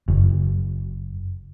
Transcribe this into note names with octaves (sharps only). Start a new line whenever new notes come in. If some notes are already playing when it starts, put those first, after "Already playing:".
F#1